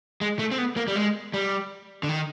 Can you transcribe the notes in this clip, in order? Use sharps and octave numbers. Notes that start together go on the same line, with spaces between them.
G#3
A3
C4
B3
A#3
G3
G#3
G3
D3
D#3